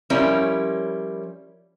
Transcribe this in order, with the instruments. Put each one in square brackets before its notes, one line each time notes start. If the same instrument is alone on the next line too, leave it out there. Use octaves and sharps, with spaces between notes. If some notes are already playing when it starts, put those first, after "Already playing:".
[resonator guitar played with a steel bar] F3 G3 C#4 E4 A#4 C#5